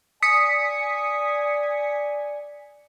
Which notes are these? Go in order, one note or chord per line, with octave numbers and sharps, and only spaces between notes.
D5 G#5 D#6 B6 C#7